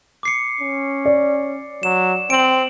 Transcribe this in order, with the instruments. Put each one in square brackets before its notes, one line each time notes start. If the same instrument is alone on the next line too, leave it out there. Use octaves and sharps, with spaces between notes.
[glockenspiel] D6 C7 C#7
[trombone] C#4
[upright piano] D5
[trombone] F#3 [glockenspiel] E7
[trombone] C4 [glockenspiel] D7 F#7